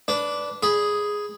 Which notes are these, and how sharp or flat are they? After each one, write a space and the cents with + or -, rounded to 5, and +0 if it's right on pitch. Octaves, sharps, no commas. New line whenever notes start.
D4 -10 B4 +0
G#4 +0 B5 +0